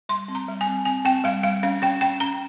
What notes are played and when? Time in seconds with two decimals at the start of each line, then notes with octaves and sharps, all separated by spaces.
0.09 G3 C6
0.28 C4
0.35 A#5
0.48 G3
0.61 G#5
0.67 C4
0.85 C4 G#5
1.05 C4 G5
1.24 G3 F5
1.43 G3 F5
1.63 C#4 F5
1.82 C#4 G5
2.01 C#4 G5
2.20 C#4 A#5